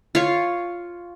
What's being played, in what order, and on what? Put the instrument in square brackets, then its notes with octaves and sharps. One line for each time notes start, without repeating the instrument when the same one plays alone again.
[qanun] F4 C#5